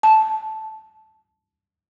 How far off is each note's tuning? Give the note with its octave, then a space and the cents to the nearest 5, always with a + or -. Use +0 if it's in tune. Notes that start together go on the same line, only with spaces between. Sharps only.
A5 -10